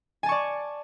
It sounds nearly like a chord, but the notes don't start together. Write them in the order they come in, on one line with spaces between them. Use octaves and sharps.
G#5 A5 C#6 D5